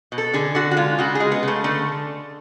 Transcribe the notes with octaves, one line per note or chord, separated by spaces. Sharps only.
B2
A4
D3 G#4
D3 F#4
F#4
G#3 F4
C#3 F#4
G#4
G#3
B3
C#3 A3
D3 A3